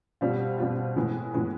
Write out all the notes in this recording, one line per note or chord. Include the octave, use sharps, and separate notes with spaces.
B2 G3 C4 F4
B2 G3 C4 F4
A2 E3 G#3 B3
A2 E3 G#3 B3